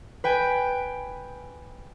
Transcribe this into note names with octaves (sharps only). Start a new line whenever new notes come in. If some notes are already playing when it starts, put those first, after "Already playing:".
B4 G5 G#5